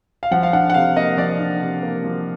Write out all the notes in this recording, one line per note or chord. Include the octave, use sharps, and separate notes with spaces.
F5
F3 F#5
F5
D4 F#5
F#5
C3 F5
A#3 D#5
F3 D5
D4
C3
A#3
F3